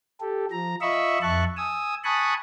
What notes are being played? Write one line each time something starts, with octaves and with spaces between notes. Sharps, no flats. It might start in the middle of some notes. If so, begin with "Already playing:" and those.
G4 A4
F3 A#5
F4 D#5 E5 B5 C#6 E6
F2 E5 A5 C#6 F#6
G#5 D#6 E6
G#5 A5 B5 C#6 D#6 F#6